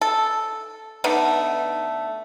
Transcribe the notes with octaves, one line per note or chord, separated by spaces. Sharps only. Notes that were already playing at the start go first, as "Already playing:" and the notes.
A4
D3 A3 B3 D#4